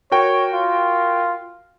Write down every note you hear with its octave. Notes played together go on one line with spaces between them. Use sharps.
F#4 A#4 C#5 G5
F4